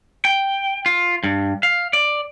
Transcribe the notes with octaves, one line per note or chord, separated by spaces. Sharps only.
G5
F4
G2
F5
D5